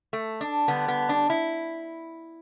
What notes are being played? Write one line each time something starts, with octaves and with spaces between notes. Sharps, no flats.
A3
D4
D3 G3 B3
B3
D4
E4